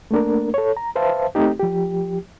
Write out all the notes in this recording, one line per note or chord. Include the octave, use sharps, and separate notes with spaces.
A3 A#3 D4 A#4
A4 C#5
A#5
B4 C5 E5 F5 A5
A3 C4 D#4 G4
F3 G4